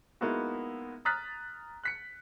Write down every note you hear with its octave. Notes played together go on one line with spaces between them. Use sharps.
G#3 A#3 B3 D#4 E4 F#4
A#5 D#6 F6 F#6 A6 B6
F#6 B6 C#7